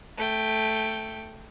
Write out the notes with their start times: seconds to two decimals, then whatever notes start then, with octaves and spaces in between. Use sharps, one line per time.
0.17 A3 G5